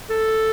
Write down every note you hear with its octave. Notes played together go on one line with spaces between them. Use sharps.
A4